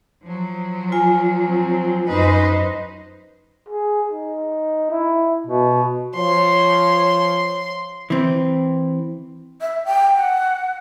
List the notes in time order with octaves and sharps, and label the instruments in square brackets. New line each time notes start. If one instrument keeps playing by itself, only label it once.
[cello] F3 F#3
[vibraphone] F4 G#5
[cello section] C4
[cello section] F#2 D#4 D#5 [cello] B4 C5
[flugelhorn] G#4
D#4
E4
[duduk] B2
[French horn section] F3 C#5 [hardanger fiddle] C6
[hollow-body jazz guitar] E3 C4
[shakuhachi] E5
G5
F#5